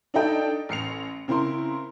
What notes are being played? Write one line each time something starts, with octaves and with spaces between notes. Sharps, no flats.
D4 D#4 A4 D#5 G5
A1 C7 C#7 F7
C#3 C4 E4 A#4 C6